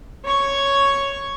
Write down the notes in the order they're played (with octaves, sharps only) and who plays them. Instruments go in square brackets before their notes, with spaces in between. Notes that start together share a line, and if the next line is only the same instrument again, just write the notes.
[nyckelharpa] C#5 C#6